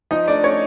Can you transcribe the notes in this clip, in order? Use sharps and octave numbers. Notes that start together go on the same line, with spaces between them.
F3 D#4 D#5
A3 D4 D5
A3 C#4 C#5